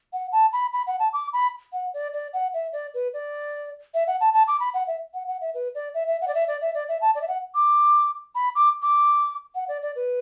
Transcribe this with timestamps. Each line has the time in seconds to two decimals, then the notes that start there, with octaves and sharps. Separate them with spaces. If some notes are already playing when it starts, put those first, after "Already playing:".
0.13 F#5
0.32 A5
0.53 B5
0.73 B5
0.87 F#5
0.99 A5
1.13 D6
1.33 B5
1.73 F#5
1.94 D5
2.13 D5
2.33 F#5
2.54 E5
2.73 D5
2.94 B4
3.14 D5
3.94 E5
4.07 F#5
4.21 A5
4.34 A5
4.48 D6
4.60 B5
4.74 F#5
4.87 E5
5.14 F#5
5.28 F#5
5.41 E5
5.54 B4
5.75 D5
5.94 E5
6.07 E5
6.21 F#5
6.28 D5
6.35 E5
6.48 D5
6.61 E5
6.75 D5
6.88 E5
7.01 A5
7.15 D5
7.22 E5
7.28 F#5
7.55 D6
8.35 B5
8.55 D6
8.82 D6
9.55 F#5
9.68 D5
9.82 D5
9.96 B4